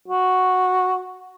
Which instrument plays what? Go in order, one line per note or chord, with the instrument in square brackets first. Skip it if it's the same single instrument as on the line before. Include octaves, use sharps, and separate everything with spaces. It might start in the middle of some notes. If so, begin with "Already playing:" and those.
[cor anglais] F#4